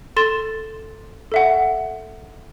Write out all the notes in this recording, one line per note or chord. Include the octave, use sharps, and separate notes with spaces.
A4 C6 A6 E7
A4 E5 F#5